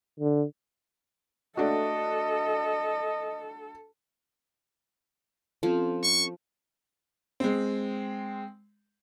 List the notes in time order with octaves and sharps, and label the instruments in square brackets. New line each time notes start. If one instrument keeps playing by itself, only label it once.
[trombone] D3
[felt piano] A3 D4 F#4 [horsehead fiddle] A4 [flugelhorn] D#5
[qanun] F3 [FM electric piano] C4 C#4 A4
[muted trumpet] C#6
[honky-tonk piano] G#3 C4